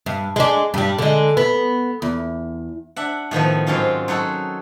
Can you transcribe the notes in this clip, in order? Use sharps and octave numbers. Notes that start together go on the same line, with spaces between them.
G2
G#3 D4
G2 G3
D3 G#3
B3
E2
D4 E5 F#5
A2 D#3 F3 B3
G#2 F#3 C4 C#4 F4 F5
F#3 D#4 F#4 A4